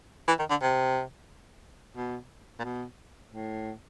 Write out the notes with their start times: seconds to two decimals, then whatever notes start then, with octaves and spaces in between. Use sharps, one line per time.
0.28 E3
0.39 D#3
0.50 D3
0.62 C3
1.97 B2
2.59 A#2
2.64 B2
3.32 A2